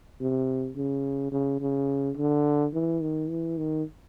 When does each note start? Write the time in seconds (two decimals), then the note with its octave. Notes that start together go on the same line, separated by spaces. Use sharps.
0.20 C3
0.76 C#3
1.32 C#3
1.61 C#3
2.17 D3
2.74 E3
3.02 D#3
3.30 E3
3.58 D#3